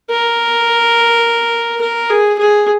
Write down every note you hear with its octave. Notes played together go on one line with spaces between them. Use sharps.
A#4
A#4
G#4
G#4